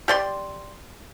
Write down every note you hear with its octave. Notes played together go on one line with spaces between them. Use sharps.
G4 D5 C6